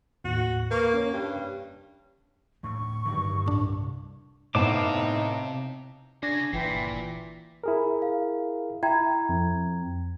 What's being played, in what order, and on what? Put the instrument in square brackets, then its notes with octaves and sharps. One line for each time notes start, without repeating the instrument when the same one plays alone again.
[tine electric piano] D#2 A2 [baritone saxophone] F#4
[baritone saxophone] A#3 [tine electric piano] B4 C#6
[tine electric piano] C#4 C#5
[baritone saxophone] G2
[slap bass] D2 A2 [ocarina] C#6
[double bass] G2 [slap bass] D3 D#3 F#3
[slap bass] C2 [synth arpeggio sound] A2 D4
[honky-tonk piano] A2 B3 C4 [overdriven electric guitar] C3 [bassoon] D#4 [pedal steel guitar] F5 A5 D6
[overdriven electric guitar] C#3 G#4 [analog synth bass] D4 [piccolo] A#6
[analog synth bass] G1 [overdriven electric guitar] A#2 [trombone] E3 [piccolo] G5
[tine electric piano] E4 G#4 A#4
[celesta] F5
[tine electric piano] E4 [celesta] G5 A#5 G#6
[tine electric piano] F2